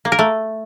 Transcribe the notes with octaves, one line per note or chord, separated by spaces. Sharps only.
A#3
A#4
A3